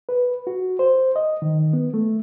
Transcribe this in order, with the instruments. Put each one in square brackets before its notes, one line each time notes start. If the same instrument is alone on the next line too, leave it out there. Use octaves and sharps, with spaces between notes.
[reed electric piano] B4
F#4
C5
D#5
D#3
B3
A3